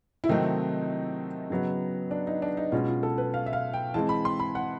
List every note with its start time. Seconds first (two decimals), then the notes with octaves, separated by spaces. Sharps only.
0.24 E4
0.29 C3 D#3 F#3 A3 C4 D#4
1.50 C#3 F#3 B3
2.11 D4
2.27 D#4
2.42 D4
2.57 D#4
2.72 B2 G#3 C#4 F4
2.88 F4
3.03 A4
3.18 B4
3.34 F5
3.46 E5
3.53 F5
3.74 G5
3.94 E3 G#3 C4 A5
4.09 B5
4.25 C6
4.40 B5
4.55 F#5